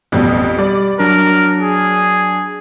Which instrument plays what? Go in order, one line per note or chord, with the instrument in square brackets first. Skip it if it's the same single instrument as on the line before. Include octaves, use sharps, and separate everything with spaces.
[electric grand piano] A1 [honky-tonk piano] F2 B2 G3
[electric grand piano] G3 [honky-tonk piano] D5
[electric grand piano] F#3 D4 [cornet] A#4
[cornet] G#4